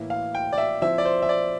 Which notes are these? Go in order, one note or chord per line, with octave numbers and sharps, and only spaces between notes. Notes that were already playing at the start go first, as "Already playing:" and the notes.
Already playing: A2 E3 A#3 E4
F5
G5
D5
E5
F3 C4 E4 E5
D5
C5
E5
D5